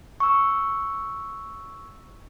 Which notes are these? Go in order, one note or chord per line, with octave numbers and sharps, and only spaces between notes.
C#6 E6